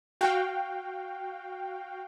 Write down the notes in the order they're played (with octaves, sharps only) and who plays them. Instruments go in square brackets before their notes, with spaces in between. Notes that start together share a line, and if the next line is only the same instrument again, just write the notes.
[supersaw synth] F#4 F5 G5